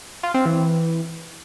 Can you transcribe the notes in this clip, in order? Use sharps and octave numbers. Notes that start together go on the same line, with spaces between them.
F4
C4
E3